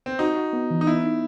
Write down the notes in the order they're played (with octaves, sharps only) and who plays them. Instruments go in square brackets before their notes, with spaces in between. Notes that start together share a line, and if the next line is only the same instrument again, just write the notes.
[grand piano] C4
[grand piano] D#4 [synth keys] F#4
[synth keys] F#4
B3
E3
[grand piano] D#4
[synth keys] B3 [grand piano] E4
[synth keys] D#4